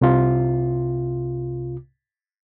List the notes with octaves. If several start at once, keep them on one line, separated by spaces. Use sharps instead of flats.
C2 C3 F4